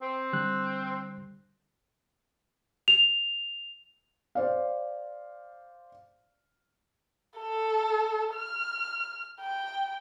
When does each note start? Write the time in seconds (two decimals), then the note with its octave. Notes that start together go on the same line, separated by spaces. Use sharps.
0.01 C4
0.33 D3 G3 F#6
2.88 F7
4.35 C5 D5 F5
7.38 A4
8.35 F6
9.41 G5